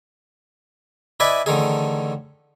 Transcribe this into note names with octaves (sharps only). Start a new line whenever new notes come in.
E4 B4 D5 D#5 G#5
A1 D3 D#3 G#4